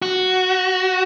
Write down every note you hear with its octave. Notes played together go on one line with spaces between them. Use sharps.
F#4